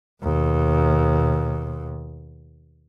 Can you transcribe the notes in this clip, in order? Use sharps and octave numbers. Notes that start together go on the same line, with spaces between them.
D#2 B2